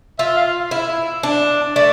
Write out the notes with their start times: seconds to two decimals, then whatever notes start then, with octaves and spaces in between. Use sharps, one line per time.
0.19 F4 E5
0.37 F5
0.71 E4
1.23 D4
1.76 A3 D5